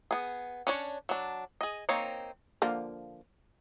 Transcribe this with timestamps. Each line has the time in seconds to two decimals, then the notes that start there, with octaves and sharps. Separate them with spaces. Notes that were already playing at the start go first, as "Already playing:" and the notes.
0.11 B3 G#4
0.67 C#4 D4 C#5
1.09 F#3 D4
1.61 G#4 D#5
1.89 A#3 C4 D#4 C#5
2.62 D3 F3 A#3